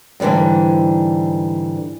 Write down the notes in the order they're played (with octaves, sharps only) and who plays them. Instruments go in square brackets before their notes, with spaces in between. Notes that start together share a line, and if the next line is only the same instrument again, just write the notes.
[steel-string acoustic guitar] G#2 D3 E3 G3 G#3